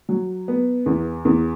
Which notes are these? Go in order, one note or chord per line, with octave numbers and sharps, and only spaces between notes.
F#3
B3
E2
E2